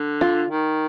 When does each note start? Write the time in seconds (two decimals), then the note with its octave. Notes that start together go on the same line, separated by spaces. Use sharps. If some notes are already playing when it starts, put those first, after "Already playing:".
Already playing: D3
0.21 F4
0.50 D#3